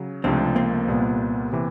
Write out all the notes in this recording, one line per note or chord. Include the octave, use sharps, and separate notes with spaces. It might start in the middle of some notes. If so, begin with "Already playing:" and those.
Already playing: C#3 F#3
C#2 C3 F3 A3 C4 D4
A#3 C4
C2 A#2 G3 B3
C3 E3